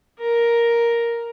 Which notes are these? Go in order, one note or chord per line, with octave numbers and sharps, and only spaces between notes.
A#4